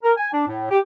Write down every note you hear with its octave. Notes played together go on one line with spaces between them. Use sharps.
A#4
G#5
D4
A2
G4